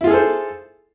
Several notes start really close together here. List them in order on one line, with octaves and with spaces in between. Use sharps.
E4 F4 G#4 A4 C5